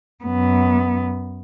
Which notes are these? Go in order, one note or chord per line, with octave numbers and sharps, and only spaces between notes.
F#2 B3